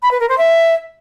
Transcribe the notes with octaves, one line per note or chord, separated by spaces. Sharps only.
B5
B4
A#4
C5
E5